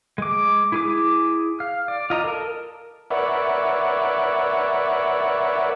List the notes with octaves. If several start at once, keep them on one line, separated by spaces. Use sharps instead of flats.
G#3 D6
E4 G#4 D6
F5
D5
F4 D#5 A#5
A4 A#4
A#4 B4 C#5 D5 E5 F#5